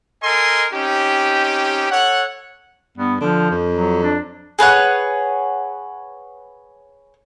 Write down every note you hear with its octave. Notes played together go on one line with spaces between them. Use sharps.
A4 A#4 D#5 G#5 C6
C4 C#4 D#4 G4
A4 C#5 F#5
G2 B3
D3 F3
F2
F#3
D4
G#4 B4 C#5 F#5